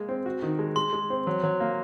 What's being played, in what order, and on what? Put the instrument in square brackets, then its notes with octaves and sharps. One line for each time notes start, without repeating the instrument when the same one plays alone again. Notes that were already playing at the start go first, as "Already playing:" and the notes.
Already playing: [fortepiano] G#3 A#3
C4
F#4
D#3
G#3
[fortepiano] G#3 [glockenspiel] C6
[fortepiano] G#3
C4
F#3
F#3
A#3